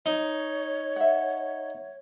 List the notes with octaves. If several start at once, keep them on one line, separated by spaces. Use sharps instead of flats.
D#4 C#5
E5 F#5